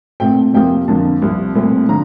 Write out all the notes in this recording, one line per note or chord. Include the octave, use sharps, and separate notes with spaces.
A#2 A3 C4 G5
F2 C3 F3 A#3 G5
F2 D3 F3 A#3 A5
C2 C3 F3
C2 A#2 A3 C4
D3 F3 A#5